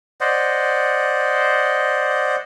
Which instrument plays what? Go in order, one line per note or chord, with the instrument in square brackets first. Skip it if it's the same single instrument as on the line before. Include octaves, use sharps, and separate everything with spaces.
[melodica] C5 D5 D#5 F#5